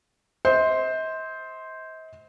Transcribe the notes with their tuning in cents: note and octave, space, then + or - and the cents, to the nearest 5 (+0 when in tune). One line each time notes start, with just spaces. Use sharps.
C5 +0 D#5 +45